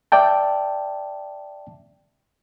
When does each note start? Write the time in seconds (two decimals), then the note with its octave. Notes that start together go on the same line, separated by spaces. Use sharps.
0.12 D5 E5 G5 A5